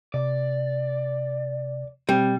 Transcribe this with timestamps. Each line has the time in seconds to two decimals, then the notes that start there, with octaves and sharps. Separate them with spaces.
0.14 C3 D5
2.09 B2 G3 C4